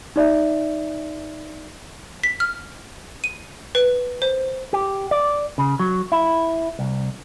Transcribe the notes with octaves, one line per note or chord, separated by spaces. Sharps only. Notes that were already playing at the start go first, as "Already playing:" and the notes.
D#4 D5 E5
B6
F6
D#7
B4
C5
G4
D5
C#3
F#3
E4
C2